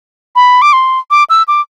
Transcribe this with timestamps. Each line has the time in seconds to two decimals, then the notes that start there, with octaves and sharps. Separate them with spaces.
0.36 B5
0.62 D6
0.73 C6
1.11 D6
1.30 E6
1.48 D6